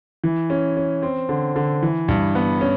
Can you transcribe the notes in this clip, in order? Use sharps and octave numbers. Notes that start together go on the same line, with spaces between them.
E3
C#4
C#4
C4
D3
D3
E3
G2
B3
C#4